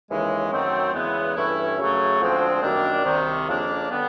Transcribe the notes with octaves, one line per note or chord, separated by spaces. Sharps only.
D#2 C#3 E3 G#3
F#2 D#3 F#3 A3 C4
E2 C#3 E3 G#3 B3
G2 E3 A3 C#4 E4
F#2 C#3 F#3 A3
D2 D3 F3 G#3 C4
F#2 D#3 G3 A#3 D4
C2 C3 D#3
F2 C#3 F3 A#3 D4
D3 G3 B3